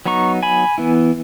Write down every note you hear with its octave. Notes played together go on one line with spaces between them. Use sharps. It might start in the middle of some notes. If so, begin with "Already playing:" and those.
F#3 B3 D#4 A#5 C#6
G#5 B5
E3 B3 E4